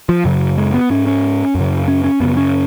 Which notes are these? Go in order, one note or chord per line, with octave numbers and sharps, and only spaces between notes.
F3
F#2 C#3 F#3
G#3
B3
G#2 C#4
C#4
F#2 C#3
C#4
C#4
F#2 C#3 B3
C#4